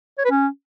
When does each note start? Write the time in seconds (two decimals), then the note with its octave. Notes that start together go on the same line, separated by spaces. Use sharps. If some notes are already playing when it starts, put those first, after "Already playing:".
0.18 C#5
0.25 B4
0.31 C#4